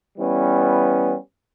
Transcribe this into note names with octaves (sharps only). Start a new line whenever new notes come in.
E3 G3 B3 C#4